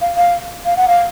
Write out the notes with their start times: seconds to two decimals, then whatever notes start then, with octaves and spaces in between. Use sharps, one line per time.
0.01 F5
0.17 F5
0.65 F5
0.77 F#5
0.88 F5